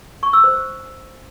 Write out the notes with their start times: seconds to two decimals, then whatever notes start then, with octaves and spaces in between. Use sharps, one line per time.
0.23 C#6
0.33 E6
0.44 C5